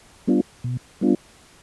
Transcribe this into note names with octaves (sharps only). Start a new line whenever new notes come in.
G3 B3 D4 F4
B2
G3 B3 D4 F4